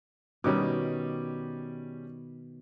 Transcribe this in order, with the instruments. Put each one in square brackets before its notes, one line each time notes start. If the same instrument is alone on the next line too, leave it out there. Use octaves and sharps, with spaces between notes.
[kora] B2 D#3 [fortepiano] G3 C#4 D6